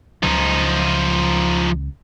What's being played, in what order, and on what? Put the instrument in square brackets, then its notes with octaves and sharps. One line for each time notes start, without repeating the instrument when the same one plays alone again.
[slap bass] C#2 C#3 F#3 [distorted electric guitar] F3 D#4